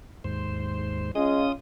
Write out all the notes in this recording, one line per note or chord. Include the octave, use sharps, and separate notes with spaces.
D#2 G#2 C5
G#3 C#4 F4 D#6